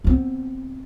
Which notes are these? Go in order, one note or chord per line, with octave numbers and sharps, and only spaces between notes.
B3 C4